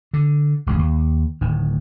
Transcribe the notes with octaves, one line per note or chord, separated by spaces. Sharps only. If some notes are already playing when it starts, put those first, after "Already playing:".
D3
E1 C#2 G2 C#3
D#2
D1 A2 D#3